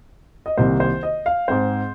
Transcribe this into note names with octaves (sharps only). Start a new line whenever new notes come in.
D#5
C2 C3 D#3 A#3 C5
C5
D#5
F5
G#2 G#3 C4 C5